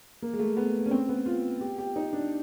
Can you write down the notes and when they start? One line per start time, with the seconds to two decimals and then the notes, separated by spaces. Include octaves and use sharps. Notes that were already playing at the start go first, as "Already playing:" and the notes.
0.22 A#3
0.33 G#3
0.39 A3
0.57 B3
0.86 C#4
0.91 C4
1.09 B3
1.26 F4
1.61 G4
1.78 G4
1.96 D#4
2.13 D4